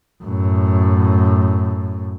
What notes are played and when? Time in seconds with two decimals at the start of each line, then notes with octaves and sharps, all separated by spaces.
0.24 F#2 A2